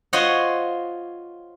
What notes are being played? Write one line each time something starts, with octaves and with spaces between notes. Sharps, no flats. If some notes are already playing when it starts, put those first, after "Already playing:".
F4 C5 C#5 D#5 F#5